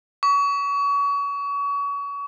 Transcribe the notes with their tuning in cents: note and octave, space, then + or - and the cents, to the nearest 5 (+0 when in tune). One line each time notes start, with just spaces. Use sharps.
C#6 +35